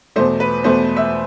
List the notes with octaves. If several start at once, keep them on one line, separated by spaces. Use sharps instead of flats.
E2 B2 A3 C5
B4
E2 B2 A3 C5
E5